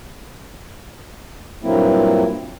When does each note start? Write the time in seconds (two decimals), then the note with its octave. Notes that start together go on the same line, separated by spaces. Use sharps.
1.63 G2 A#2 F#3 A#3 C4 E4